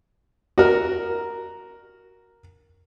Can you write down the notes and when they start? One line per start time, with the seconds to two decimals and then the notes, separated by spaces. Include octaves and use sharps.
0.58 F#4 A#4